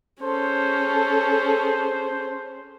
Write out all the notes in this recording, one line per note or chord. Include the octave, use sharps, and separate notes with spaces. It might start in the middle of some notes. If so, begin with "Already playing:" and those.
C#4 G#4 A4 C5